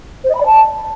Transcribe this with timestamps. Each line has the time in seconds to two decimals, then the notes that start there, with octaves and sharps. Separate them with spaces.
0.24 C5
0.29 D#5
0.34 B5
0.40 D5
0.45 A5